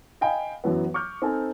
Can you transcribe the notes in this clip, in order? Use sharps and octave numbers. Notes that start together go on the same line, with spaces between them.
D#5 F5 G5 G#5 B5
F#2 E3 F#3 B3
C#6 D6 F6 G6
C4 D#4 A4 C5 G#5 A5